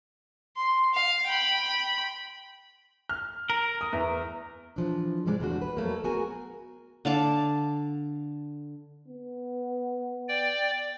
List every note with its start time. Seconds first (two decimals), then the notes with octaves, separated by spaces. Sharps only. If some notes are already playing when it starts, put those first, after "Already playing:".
0.56 C6
0.94 F5
1.27 G5 B5
3.09 F6
3.50 A#4
3.81 D#6
3.93 E2 E5
4.76 E3 F3 D4
5.26 G#2 C3 G3 G#3 G4 D5
5.40 E2 C#3 A3 D4 F#4
5.62 B4
5.77 F2 F#3 A3 A#3
6.04 B3 F#4 G#4 A#4 G#5
7.05 D3 F5 A5 D6
9.08 B3
10.29 D5 G5